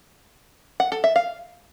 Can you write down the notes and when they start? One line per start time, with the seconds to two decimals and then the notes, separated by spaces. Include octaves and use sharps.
0.80 F#5
0.92 A4
1.04 E5
1.16 F5